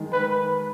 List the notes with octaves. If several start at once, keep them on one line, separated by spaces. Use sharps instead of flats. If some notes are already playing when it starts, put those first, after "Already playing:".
Already playing: D#3 G#3 D#4
B4